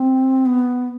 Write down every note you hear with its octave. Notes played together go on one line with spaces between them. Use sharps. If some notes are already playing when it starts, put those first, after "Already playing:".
Already playing: C4
B3